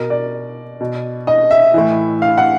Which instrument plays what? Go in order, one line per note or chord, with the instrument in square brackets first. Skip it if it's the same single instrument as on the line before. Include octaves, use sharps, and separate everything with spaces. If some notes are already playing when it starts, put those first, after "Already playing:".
Already playing: [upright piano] B2 A#4
D5
B2
D#5
E5
A2 E3
F5
F#5